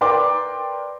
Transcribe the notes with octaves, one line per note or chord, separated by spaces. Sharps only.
A#4 B4 D5 G5 C6 D6